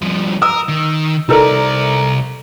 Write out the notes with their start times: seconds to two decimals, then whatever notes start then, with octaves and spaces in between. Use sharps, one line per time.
0.01 G2 F3
0.42 A#4 D#6 E6
0.69 D#3
1.29 C2 D#4 A4 A#4 D5